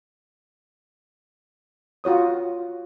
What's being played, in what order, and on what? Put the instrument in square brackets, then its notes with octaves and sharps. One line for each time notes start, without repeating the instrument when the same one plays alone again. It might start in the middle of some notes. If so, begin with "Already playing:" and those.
[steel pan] F4 F#4 C#5 D#6